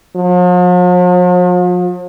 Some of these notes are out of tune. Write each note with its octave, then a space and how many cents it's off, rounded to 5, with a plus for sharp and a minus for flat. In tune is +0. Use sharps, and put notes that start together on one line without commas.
F3 +45